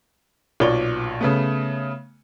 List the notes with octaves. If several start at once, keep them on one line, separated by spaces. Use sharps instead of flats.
B1 A#2 C#5 D5 G7
C#3 A3 B3